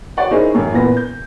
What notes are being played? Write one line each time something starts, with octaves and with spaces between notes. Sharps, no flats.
F#4 C#5 D5 F#5
C#4 D#4 E4 G#4 A#4 C5
A1 F#2
A#2 E3 B3 A#4 A#6
G6